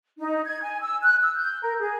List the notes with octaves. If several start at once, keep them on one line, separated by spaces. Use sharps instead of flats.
D#4
G#6
G#5
E6
F#6
E6
G6
A#4
G#4